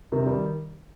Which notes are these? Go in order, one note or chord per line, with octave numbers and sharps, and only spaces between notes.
C3 D#3
D#3 G3